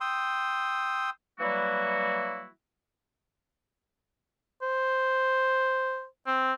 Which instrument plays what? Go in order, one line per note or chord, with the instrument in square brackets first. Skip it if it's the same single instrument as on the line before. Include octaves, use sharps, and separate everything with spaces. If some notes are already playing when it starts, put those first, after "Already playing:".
[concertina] G5 C6 D#6 E6
[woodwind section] E3 F#3 G3 A#3 E4 F#4
[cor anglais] C5
C4